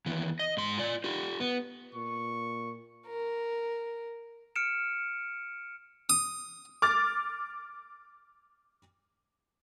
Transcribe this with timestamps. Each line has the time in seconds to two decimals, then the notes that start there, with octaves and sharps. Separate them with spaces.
0.06 D#2 E3
0.39 D#5
0.57 G#2 C6
0.78 F4 D5
1.04 F4 G4
1.40 B3
1.95 A#2 C#6
3.07 A#4
4.56 F6 C#7 D7 E7
6.09 D#6
6.82 D6 F6 A6